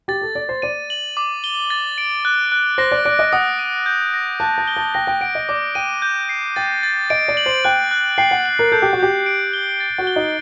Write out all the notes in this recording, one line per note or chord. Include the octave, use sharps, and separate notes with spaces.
G4 A6
A4
D5 A6
C5
D5 D#7
F#7
D6
G7
A6
D7
F#6
F#6
C5 A#6
D5
D5 D7
D#5
F#5 D#6
D#7
G6
A#6
A5 F#6
A5
G7
A5
G5 A#6
G5
F#5 D7
D#5
D5 D6
G5 D#7
G6
C7
G5 A6
A6
D#5 D7
D5
F#7
C5
G5 F#6
F#6
G5 C7
F#5
F#7
A#4
A4 G6
G4
F#4
G4 G6
D7
G7
A6
F#4
G7
D#4